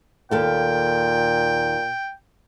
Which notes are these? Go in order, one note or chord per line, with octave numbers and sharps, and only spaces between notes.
D#2 A#2 A4 F5 G5